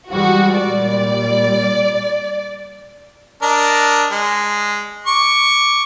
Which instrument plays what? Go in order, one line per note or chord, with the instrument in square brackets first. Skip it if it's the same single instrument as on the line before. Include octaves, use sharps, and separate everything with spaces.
[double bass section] E3 G3 G#3 [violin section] F#4
[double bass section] A#2 G3 [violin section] D5
[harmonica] D4 A#4 D#5
G#3
C#6 D6